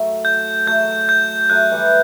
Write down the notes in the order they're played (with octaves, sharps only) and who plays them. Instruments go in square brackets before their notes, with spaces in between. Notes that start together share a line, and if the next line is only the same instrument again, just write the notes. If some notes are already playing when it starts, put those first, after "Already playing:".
Already playing: [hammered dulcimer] F#3 A3
[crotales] G6
[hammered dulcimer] F#3 A3 [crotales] G6
[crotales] G6
[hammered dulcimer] F#3 A3 [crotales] F#6
[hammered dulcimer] E3 G3